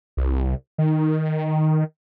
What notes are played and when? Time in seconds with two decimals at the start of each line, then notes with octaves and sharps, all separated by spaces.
0.17 C2
0.78 D#3